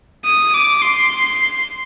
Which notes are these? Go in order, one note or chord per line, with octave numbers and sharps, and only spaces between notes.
D#6
D6
C6